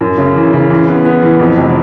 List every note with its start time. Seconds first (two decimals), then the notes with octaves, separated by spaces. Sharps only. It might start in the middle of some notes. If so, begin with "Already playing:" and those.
0.01 F#2
0.18 C#3
0.36 E3
0.53 C#3
0.70 E3
0.88 B3
1.05 B3
1.22 E3
1.40 F2
1.57 F1